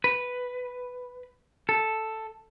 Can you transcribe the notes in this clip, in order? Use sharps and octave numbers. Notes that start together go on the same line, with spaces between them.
B4
A4